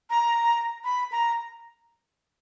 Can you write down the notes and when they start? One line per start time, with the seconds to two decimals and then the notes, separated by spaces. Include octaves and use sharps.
0.10 A#5
0.84 B5
1.12 A#5